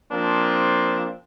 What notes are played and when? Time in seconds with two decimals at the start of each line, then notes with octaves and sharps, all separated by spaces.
0.12 F3 A#3 C4 D4